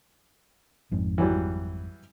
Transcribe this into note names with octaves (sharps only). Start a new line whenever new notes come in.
G#1 F2 G#2
E3 F#3 G3